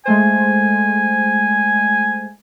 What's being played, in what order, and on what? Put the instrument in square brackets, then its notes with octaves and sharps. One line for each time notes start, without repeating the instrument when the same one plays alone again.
[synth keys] G#3 A3 C5 [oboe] G#5